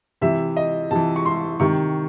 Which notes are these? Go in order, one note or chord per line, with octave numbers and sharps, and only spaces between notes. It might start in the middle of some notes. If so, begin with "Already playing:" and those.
C3 E3 E5
D#5
C3 E3 A5
C#6
C6
C3 D#3 C#6